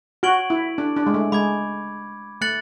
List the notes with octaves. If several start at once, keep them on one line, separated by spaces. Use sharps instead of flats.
F#4 C#6 G#6 D7 F#7
E4
D4
D4
G#3
A3
G#3 B5 D6 G#6
A3 F#6 A6 C#7 F#7